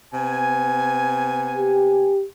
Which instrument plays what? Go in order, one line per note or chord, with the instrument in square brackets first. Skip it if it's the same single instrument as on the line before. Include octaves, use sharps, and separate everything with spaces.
[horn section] C3 B3 G#5
[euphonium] G4